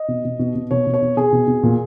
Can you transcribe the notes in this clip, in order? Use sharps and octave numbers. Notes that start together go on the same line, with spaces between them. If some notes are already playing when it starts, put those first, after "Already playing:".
Already playing: D#5
B2
B2
B2
B2
B2 C#5
B2
C#5
B2
B2 G#4
B2
B2
A#2